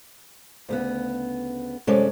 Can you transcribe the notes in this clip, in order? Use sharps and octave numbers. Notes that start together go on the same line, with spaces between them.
D2 C#3 B3
F#2 C3 G#3 C#4 A4 D5